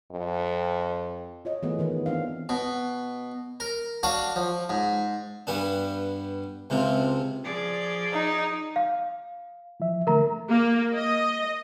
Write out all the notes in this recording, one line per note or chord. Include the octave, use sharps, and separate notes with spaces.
F2
F4 C#5 D#5
E3 A3 B3 G#4
D#3 E3 B3
C4 D4 F5
B2
A#4
D4 F#4 F5 C#6
F3
G#2
G2 G3 B3 D4
C#2 C3 F3
F3 G#4 D5
D#4
F5
E3 F3 E5
D3 A3 A#4 A#5
A#3
D#5